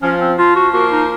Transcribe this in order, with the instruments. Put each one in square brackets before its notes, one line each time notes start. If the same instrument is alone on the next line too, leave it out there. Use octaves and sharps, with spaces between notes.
[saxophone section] F3 [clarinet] C#4
[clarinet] C4
[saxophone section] F3 [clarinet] F4
[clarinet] F#4
[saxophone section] A#3 [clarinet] F#4
[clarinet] D#4